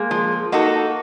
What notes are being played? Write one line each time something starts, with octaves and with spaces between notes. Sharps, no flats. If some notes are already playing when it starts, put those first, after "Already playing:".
Already playing: G#3 A#3
F3
A#3 D#4 F#4 A4